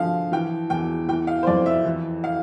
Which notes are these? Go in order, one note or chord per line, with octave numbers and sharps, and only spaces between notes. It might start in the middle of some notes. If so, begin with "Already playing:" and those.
Already playing: D3 F3 F5
E3 G5
E2 G5
E3 G5
F5
C5
F2 D5
E5
E3
F5